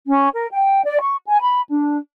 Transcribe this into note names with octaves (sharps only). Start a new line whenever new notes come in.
C#4
A#4
G5
D5
C#6
G#5
B5
D4